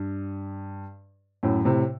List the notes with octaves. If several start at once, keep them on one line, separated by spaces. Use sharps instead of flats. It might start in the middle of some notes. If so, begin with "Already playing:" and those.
Already playing: G2
F#2 A2
A2 C3